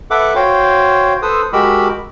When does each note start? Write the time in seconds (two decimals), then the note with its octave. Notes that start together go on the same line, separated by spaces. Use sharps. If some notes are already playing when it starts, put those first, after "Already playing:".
0.11 A4 B4 E5 F#5 D6
0.35 F#4 C5 C#5 F5 G5
1.22 A4 B4 C5 D#6 E6
1.53 G#3 F#4 G4 A#4 B5 E6